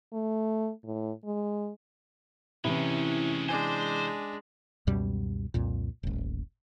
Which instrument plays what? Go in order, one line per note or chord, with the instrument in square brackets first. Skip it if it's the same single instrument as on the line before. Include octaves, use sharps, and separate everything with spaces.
[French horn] A3
A2
G#3
[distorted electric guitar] A2 G#3 [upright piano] C3 E3 [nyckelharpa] C#4 [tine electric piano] E4
[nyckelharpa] G#3 D4 [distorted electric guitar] C5 [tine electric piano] G#5 D6
[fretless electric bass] C#2 F#2 B2 G3
C2 F2 A#2
D#1 A1